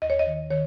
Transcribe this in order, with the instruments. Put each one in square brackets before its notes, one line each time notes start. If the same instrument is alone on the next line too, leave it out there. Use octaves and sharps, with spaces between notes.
[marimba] D#2 D#5
C#5
D#5
D#3
D#3 C#5